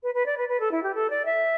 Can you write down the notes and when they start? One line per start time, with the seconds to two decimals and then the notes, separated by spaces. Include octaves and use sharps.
0.02 B4
0.14 B4
0.25 D5
0.37 B4
0.48 B4
0.60 A4
0.71 E4
0.83 G4
0.94 A4
1.09 D5
1.25 E5